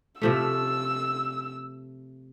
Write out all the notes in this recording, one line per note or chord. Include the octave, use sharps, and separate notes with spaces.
C3 F3 A3 E6